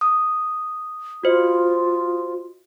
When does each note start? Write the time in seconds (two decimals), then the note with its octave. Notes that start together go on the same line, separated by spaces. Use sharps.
0.01 D#6
1.23 F4 F#4 C5 D#5